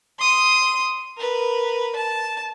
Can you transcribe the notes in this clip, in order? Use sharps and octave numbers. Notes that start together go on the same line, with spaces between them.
C6 D#6
A#4 B4
A5